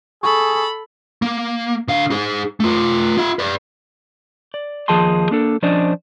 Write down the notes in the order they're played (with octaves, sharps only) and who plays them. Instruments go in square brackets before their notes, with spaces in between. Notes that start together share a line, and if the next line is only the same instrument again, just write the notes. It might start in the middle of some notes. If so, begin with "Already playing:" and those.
[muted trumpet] G#4 [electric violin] A4 B5 [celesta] C#6
[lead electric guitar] A#3
D3 F5
D#4 G#4
A3 F4
F4 E5
B4 D5
[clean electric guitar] D5
D#2 F3 G#4 D#5 A5 C6
A#3 D4 A4
F3 C#4 D4 C5 D5 D#5